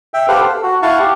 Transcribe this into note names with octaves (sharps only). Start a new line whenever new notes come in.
E5 G5
G4 A4 B4 C5 F5 F#5
A4
F#4
E4 F5 F#5 A5 C#6
G4